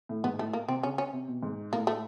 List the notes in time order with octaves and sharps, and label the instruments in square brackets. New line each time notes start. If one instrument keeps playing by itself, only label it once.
[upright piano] A2
[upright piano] G#2 [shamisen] B3
[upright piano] A2 [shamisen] A3
[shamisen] A#3
[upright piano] C3 [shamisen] C4
[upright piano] C#3 [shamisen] C#4
[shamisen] C#4
[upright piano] C3
B2
G#2
[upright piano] A2 [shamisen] A#3
[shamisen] A3